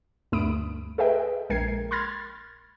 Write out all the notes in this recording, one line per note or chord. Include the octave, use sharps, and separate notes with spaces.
D2 G2 A3 B5 D#6 D7
G#4 A4 B4 D#5 E5 G5
A#1 G#3 A#4 G5 G#6 C7
B5 C6 F6 G#6 A6